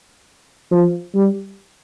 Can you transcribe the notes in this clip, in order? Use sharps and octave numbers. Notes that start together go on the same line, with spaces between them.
F3
G3